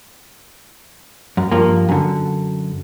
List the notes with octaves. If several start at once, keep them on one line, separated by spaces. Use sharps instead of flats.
F#2
G2 F3 A#3
F#2 D3